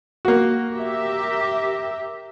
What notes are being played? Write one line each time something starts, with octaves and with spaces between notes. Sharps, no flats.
A#3 F#4
G4 A#4 E5